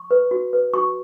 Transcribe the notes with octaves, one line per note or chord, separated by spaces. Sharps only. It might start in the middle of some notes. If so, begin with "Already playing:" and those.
Already playing: C#6
B4
F#4
B4
F#4 C#6